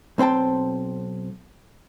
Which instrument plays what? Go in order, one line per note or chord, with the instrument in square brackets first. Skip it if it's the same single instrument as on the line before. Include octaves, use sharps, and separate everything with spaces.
[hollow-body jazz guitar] B1 C4 C5 G5 A5